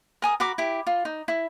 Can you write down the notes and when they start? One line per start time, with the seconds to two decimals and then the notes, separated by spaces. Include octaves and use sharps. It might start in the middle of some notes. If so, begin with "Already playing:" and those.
0.22 A#4 G#5 D#6
0.40 F#4 A#4 B5 D6
0.58 E4 G4
0.87 F4
1.05 D#4
1.28 E4